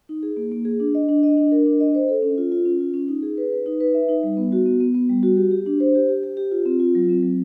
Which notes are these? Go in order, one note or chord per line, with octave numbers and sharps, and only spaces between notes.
D#4
G#4
A#3
A#3
G#4
D4
D#5
D4
D#5
D4
A#4
D4
D#5
C5
A4
C#4
F4
F4
C#4
F4
C#4
D#4
G#4
B4
B4
D#4
B4
E5
D#4
G3
B3
F#4
B3
B3
B3
G3
F#4
G4
G4
D4
C5
G4
G4
G4
G4
F4
C4
F4
F#3
C4
F#3